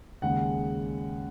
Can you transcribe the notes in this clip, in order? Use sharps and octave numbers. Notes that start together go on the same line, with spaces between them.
D#2 C#3 G#3 F#5